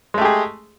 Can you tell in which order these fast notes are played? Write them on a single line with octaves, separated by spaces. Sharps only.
G#3 A3 G4 G#4